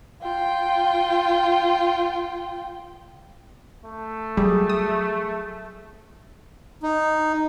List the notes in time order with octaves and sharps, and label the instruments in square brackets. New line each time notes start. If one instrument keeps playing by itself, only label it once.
[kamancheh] F4 G5
[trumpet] A3
[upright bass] F#3 [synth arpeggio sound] G3 [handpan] G#4
[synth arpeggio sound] D#6
[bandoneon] D#4